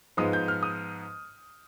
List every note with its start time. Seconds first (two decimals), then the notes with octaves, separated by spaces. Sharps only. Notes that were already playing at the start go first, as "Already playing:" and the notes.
0.17 G#2 F3 G#3 B3 D#6
0.33 G6
0.48 F6
0.63 D#6